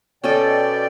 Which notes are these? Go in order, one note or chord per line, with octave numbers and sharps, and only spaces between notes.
B2 C#4 A4 D5 D#5 G5